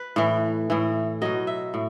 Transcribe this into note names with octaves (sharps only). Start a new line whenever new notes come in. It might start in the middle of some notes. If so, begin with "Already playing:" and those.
Already playing: B4
A2 E3
A2 E3
B2 F#3 D#5
E5
A2